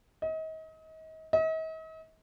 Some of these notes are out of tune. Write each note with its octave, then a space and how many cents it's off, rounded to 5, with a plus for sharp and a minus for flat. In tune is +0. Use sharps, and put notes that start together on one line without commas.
D#5 +35
D#5 +45